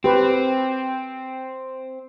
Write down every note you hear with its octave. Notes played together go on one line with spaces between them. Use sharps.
C4 G4 B4